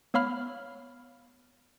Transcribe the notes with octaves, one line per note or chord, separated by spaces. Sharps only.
B3 C#5 F5 B5 F6